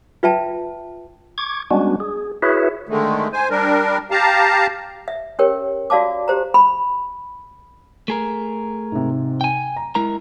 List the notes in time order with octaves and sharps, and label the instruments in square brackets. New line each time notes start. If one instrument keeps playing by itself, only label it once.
[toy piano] F4 B4 E5 G5 A5
[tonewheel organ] C#6 D6 G#6
G3 G#3 B3 C#4 D4 F#4
G#4
E4 F#4 G#4 B4 C#5 E5
[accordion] D3 D#3 G#3 A3
C5 G#5
G3 D4 A#4
G4 F5 A5 A#5
[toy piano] E5
C#4 G4 A#4 C#5 G5
F4 F#4 D5 F5 A5 D6
G4 C5 A#5
B5
[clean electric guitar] A3 G#4 A#4
[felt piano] G#2 C3
[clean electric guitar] G5 G#5
[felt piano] A#5
[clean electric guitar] G#3 A#4 A#5 [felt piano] E4